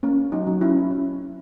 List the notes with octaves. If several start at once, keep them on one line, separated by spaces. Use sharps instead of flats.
A#3 C#4
C#4
F#3 D#4
F#3
C#4 E4
C#4
C#4